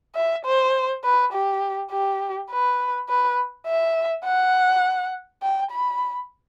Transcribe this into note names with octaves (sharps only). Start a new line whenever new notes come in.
E5
C5
B4
G4
G4
B4
B4
E5
F#5
G5
B5